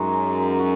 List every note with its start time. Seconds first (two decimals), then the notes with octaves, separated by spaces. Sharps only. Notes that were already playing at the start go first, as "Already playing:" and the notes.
Already playing: F#2 G#3 D#4 F#4
0.60 F#4